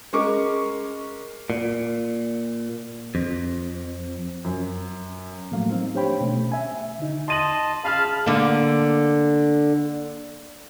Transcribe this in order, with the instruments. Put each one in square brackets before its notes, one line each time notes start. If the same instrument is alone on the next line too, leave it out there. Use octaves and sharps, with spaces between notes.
[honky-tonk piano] G#3 C#4 A#4 C#6 D6
[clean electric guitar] A#2
F2
[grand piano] F#2
[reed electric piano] A2 F3 F#3 A3 A#3 F5
G3 C4 D#4
D4 G4 C5 C#5 G5 B5
B2 A3 C#4
E5 G#5
D3 D#4
[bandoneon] D#5 A5 [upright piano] C6 D#7 F#7
[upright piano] C#3 F6 [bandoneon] F5 A5 B5
[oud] D3 A#3